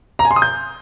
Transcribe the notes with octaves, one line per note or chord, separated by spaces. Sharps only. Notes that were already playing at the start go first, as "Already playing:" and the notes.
A#5
G#5
C6
D#6
G6